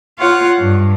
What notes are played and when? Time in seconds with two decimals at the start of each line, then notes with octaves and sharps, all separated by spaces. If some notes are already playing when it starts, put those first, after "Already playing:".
0.20 F4 C#5 F5 F#5
0.60 G2